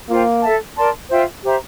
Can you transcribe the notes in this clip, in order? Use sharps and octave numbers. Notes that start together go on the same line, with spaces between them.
A#3 F4 C5 G5
A4 E5 A5
A#4 D5 A5 C6
F4 C5 E5 G5
G4 C5 E5 A#5